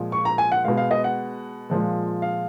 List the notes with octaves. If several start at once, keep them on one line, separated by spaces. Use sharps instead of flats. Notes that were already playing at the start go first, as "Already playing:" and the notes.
Already playing: A#2 F3 G#3
C#6
A#5
G#5
F#5
B2 G#3 F5
F5
D#5
F#5
A#2 F3 G#3
F5